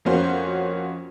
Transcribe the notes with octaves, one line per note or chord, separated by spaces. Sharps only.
F2 A#3 C#4 F#4 C5